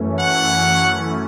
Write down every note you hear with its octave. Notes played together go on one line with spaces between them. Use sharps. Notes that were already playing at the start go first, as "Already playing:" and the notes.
Already playing: F#2 E3 A3 C#4
F#5